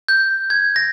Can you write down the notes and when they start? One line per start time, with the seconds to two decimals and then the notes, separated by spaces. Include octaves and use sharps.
0.08 G6
0.50 G#6
0.76 A#6